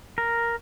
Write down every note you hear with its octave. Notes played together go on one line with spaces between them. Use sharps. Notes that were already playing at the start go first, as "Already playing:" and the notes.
A#4